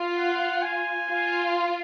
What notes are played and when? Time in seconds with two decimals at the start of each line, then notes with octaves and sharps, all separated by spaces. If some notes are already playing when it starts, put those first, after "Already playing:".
Already playing: F4
0.16 F#5
0.62 G#5
1.09 F4